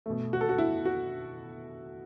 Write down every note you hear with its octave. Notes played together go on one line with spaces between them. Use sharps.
B2 A3
F#4
A4
F#4
E4
F#4